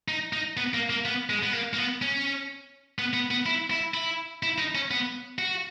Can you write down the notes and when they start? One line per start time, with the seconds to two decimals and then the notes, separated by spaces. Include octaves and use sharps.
0.08 D#4
0.33 D#4
0.57 B3
0.74 A#3
0.90 A#3
1.05 B3
1.30 G#3
1.43 B3
1.53 A#3
1.74 A#3
1.78 B3
2.02 C#4
2.99 B3
3.14 B3
3.31 B3
3.46 E4
3.71 E4
3.94 E4
4.43 E4
4.58 D#4
4.75 C#4
4.91 B3
5.39 F#4